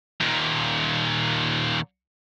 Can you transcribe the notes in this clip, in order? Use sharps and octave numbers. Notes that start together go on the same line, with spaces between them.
D#2 A#2